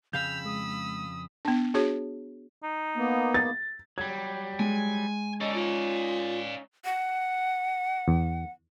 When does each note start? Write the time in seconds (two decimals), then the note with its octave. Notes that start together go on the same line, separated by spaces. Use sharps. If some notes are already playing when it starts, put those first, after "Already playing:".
0.13 F2 C#3 F5 B5 E6 G6 F7
0.46 G#3 D#6
1.45 B3 D4
1.74 D4 F#4 G#4 C#5
2.64 D#4
2.97 A#3 B3
3.34 A6
3.98 F#3 G3 G#6
4.59 G#3 G#5
5.41 C#4 D#4 A4 D5 D#5
5.54 F4 D5 F5
6.85 F#5
8.08 E2